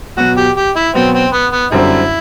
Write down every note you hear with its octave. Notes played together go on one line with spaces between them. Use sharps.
B2 F#3 B3 F#4
G4
G4
E4
B2 F#3 B3 C4
C4
B3
B3
F#2 D3 G3 C4 E4